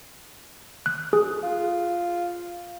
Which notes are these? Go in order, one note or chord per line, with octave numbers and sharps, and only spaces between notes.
F#6
G#4
F4